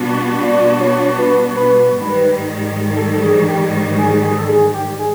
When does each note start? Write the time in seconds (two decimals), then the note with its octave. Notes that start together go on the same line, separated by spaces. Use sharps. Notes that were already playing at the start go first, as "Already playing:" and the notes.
Already playing: B2 G3 B3 D4 F#4
0.43 D5
0.80 C#5
1.18 B4
1.56 B4
1.94 G#2 D#3 G3
2.96 A4
3.22 G#4
3.48 G4
3.97 G#4
4.24 G#4
4.38 A4
4.48 G#4
4.73 G4
4.99 G#4